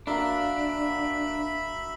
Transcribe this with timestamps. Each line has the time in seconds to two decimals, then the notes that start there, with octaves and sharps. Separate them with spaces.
0.07 A#3 D4 F#4 A#4 E5 B5